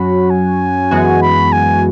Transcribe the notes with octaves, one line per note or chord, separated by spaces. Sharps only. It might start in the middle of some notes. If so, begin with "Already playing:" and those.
Already playing: F#2 F#3 C#4 F#4 B5
G#5
F#2 E3 G#3 B3 F#4
B5
G#5